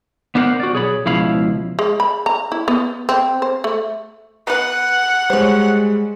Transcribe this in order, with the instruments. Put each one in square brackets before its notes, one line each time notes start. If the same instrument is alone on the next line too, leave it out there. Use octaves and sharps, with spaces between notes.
[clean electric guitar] B3 D4 E4 A#4 C5 F#5
F#4 D5
B1 G#4 C#5 B5
C#2 B2 F3 E4 F5 B5
[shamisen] G#3
B5
A#5
E4
B3
C4
C5
A3
[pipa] B3 B4 [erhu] F#5
[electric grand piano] G3 G#3 [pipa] C5 C#5